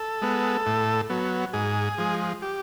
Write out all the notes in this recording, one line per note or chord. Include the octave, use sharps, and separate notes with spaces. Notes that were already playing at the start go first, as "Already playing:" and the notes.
Already playing: A4
G#3 B3
A2
F#3 B3
G#2 G#4
F3 G#3
G4